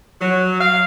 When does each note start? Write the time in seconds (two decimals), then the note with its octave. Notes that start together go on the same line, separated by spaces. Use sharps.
0.21 F#3
0.60 F5